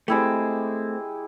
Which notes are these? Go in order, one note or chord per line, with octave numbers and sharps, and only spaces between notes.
G#3 A3 C4 E4 G4